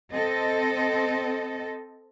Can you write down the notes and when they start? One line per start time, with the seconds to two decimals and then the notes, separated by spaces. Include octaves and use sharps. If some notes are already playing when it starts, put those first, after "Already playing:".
0.10 C4 A4 D#5